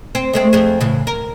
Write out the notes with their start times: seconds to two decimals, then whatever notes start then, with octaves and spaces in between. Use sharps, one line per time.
0.15 C4
0.33 G#3 A3 C4
0.53 F2 G#4
0.81 A2 C#3 E3
1.07 A#4